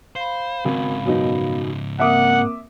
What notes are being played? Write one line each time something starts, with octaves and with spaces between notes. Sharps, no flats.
C5 F5 B5
G#1 G#2 C#3
F#2 B2 D#4
A#3 C4 A#4 E5 F#5 D6 D#6